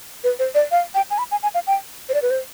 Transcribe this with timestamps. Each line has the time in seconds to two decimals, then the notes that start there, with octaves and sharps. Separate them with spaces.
0.24 B4
0.39 C5
0.55 D5
0.71 F5
0.95 G5
1.11 G#5
1.18 B5
1.31 G#5
1.43 G#5
1.54 F5
1.67 G5
2.09 C5
2.14 D5
2.22 B4
2.31 C5